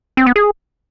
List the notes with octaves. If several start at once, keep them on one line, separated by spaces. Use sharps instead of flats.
C4
B3
G#4